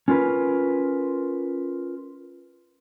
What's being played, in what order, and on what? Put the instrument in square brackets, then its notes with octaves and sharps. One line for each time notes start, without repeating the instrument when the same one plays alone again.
[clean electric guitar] C#4 F4 A#4 B4